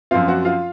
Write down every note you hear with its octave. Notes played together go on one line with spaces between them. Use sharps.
F#2 F3 C4 F4 F5
F#4 F#5
F4 F5